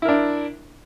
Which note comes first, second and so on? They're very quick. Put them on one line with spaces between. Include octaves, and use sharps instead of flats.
E4 A#4 D4